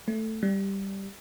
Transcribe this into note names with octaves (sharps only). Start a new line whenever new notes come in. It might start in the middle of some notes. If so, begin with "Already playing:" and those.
A3
G3